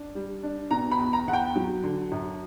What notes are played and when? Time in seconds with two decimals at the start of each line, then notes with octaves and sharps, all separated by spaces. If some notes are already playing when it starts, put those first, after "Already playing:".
Already playing: D4
0.15 G3
0.43 D4
0.71 B2 A#5
0.91 B5
0.99 E2
1.13 A#5
1.28 E2 F#5
1.33 G5
1.56 F#3
1.83 D3
2.12 F#2